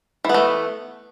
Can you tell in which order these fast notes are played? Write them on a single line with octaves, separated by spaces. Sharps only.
E3 B3 A3